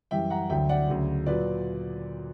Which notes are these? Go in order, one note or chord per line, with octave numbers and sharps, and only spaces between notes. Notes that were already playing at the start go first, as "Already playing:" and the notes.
F#2 E3 G3 E5 G5
F#5 A#5
D2 D3 F#3 E5 G5
D5 F#5
D2 C#3 F#3
A#2 F#3 B4 D5